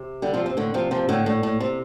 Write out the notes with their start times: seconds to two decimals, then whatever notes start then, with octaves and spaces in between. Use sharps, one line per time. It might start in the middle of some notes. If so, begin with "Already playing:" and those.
Already playing: C3
0.22 D3 G3
0.34 C3 F3
0.46 C3
0.57 A2 D3
0.74 C3 F3
0.91 C3 F3
1.09 A2 D3
1.26 A2
1.43 A2
1.60 C3